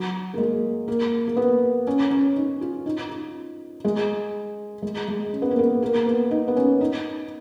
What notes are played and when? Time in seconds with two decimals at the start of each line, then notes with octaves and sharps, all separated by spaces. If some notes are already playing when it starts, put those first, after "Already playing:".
Already playing: F#3
0.34 A#3
0.38 G#3
0.88 A#3
1.27 A#3
1.37 B3
1.87 C#4
2.11 C#4
2.36 D#4
2.61 F4
2.86 D#4
3.09 F4
3.84 G#3
4.82 G#3
5.08 G#3
5.33 C#4
5.42 B3
5.51 A#3
5.59 B3
5.82 A#3
6.06 B3
6.31 D#4
6.48 B3
6.56 C#4
6.81 D#4